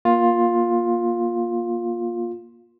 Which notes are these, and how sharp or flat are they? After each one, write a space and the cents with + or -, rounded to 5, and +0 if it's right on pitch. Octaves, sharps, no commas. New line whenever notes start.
A#3 +20 F4 +10